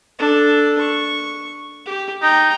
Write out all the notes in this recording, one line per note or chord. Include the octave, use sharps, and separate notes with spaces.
D4 A4
C#6
G4
D#4 G5 A#5